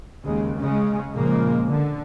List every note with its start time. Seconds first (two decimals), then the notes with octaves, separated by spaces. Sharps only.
0.24 D#2 C#3 G#3
0.59 C#3 G#3 C#4
1.14 A#2 C#3 F3 G#3 A#3
1.67 D3